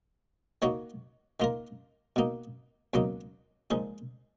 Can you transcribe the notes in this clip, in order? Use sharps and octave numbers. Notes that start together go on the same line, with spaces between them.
D#3 A#3 D#4 F#4 C#5
D#3 A#3 F4 A#4
B2 A#3 D#4
C#2 B2 F#3 A#3 D#4
A#2 F3 G#3 D#4